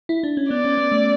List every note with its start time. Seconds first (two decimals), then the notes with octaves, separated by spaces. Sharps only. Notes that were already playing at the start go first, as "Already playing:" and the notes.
0.09 E4
0.23 D4
0.37 C#4
0.50 B3 D5
0.65 C#4
0.77 B3
0.92 A3